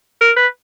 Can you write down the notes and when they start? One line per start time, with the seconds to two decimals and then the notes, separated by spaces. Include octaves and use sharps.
0.21 A#4
0.36 B4